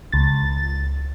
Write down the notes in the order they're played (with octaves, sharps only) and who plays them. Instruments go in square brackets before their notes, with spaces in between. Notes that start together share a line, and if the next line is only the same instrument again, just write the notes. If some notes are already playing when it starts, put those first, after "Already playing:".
[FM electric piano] C#2 A6